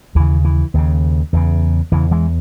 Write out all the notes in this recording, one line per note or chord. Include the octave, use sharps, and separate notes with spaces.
D#2 C#3 E3
E3
D#2 C#3
E2 C#3
E2 C#3 E3
E3 G#3